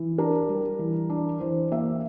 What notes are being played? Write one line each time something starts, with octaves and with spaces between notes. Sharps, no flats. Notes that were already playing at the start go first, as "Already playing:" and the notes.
Already playing: E3
D4 A#4
G3
E3
D4
E3 C5
A#3 E5